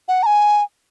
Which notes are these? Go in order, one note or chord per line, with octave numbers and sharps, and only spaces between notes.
F#5
A#5
G#5